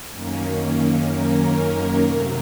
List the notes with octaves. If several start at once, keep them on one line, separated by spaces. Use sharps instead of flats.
F#2 D#3 A#3 C#4
A#4
C3 F#3 A3